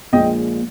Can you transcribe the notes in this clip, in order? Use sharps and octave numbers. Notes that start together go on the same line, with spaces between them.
A#1 A#2 F3 G#3 D#5 G5